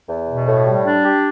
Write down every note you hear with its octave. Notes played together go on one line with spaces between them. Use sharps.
E2
B2
A2
G3
D4
G4